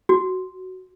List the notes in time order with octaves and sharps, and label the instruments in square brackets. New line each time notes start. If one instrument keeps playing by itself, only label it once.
[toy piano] F#4